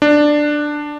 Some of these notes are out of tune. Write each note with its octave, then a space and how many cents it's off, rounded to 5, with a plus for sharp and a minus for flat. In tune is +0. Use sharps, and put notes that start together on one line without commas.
D4 +10